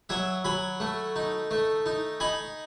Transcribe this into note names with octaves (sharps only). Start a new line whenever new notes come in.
F#3 E5 G#5
F#3 G#5 B5
A3
D#4
A3
D#4
D#4 G#5 B5